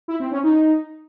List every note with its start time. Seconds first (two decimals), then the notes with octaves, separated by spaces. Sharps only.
0.08 E4
0.20 C4
0.32 C#4
0.43 D#4